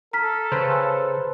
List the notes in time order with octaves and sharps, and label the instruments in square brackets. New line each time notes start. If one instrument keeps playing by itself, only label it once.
[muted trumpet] A4 [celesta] A#5 F6 B6
[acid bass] C#3 [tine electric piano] B4 C5